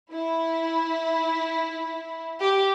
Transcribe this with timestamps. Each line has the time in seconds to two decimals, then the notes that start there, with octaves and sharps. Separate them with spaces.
0.13 E4
2.41 G4